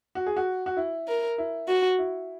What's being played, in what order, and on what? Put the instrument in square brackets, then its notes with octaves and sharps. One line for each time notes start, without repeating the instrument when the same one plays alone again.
[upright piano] F#4
G#4
F#4
F#4
E4
[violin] A#4
[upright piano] E4
[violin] F#4
[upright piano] E4